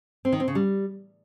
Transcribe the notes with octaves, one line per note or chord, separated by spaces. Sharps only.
C4
D#3
C4
C#3
G3